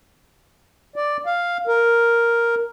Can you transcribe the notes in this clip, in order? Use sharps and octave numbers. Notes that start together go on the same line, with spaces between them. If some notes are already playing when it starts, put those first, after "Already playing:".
D5
F5
A#4